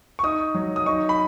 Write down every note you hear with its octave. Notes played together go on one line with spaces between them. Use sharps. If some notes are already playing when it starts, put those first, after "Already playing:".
C#6
D#4 D#6
F#3
D#6
D#4 C#6
B5